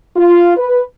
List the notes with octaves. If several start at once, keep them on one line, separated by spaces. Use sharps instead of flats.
F4
B4